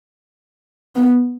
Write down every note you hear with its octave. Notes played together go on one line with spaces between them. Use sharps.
B3